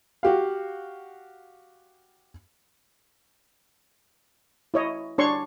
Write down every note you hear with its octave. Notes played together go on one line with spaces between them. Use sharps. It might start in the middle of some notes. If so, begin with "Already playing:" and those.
F#4 G4 F5
E4 C#5 D#5
D4 C#5 C6 C#6